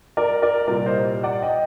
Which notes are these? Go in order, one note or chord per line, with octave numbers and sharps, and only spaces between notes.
A#4 D5
A#4 D5
C2 A#2 G3 A#4 D5
C5 D#5
D5 F#5
D#5 G5